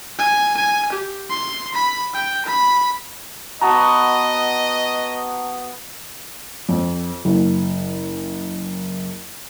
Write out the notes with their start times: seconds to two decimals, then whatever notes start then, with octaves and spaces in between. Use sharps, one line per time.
0.19 G#5
0.57 G#5
0.92 G4
1.30 C6
1.74 B5
2.14 G5
2.46 B5
3.61 B3 F#4 D#5 A5 A#5
6.69 F2
7.25 F#1